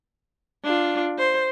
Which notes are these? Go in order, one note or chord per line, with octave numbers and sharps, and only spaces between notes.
D4 F4
C5